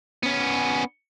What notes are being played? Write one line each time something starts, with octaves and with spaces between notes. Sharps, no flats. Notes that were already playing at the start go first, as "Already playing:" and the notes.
B3 C#4